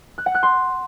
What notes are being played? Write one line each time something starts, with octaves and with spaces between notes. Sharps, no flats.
F#6
F#5
F#6
C6